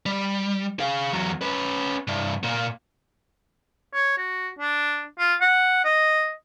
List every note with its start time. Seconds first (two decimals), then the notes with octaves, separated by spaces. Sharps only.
0.06 G3
0.80 G#4 F5
1.13 E2 F#3
1.41 C#4 B4
2.08 C2 G2
2.44 A#2 A#3
3.94 C#5
4.18 F#4
4.59 D4
5.19 F4
5.41 F#5
5.85 D#5